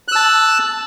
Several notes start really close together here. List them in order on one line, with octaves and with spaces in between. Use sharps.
F#6 E6 A5